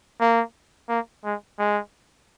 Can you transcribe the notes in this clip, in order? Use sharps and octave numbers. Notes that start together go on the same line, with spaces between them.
A#3
A#3
G#3
G#3